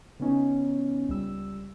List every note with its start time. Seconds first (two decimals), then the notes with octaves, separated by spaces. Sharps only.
0.20 C#3 B3 C#4 D#4
1.09 C#2 G3 E6